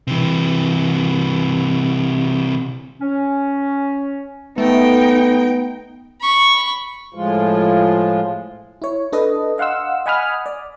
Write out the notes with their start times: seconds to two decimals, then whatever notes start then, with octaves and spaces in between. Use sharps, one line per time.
0.07 C3 E3
3.01 C#4
4.58 A3 B3 D#4 G5
6.21 B5 C#6
7.14 A2 F3 G#3 F4
8.82 E4 C#5
9.12 D4 A4 B4 D#5
9.58 D#5 F5 F#5 C6 E6
10.06 D#5 F#5 G#5 B5 D#6 F6
10.46 D5